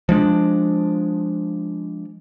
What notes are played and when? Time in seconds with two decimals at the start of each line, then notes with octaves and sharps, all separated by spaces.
0.09 F3 G#3 D4